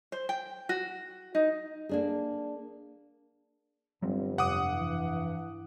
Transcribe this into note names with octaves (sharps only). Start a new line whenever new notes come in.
C5
G5
F#4
D#4
A#3 D4 G#4
G1 G2 F#3 G3 C4
F1 F#5 D6 D#6
E3